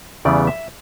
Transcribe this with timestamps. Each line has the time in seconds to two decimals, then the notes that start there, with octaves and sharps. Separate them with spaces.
0.25 E2 C#3 E3 G3 B3 D5
0.47 E5